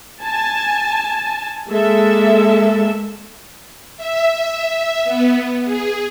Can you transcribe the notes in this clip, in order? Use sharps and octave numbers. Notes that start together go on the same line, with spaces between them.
G#5 A5
G#3 A#3 A4 E5
E5
B3
G#4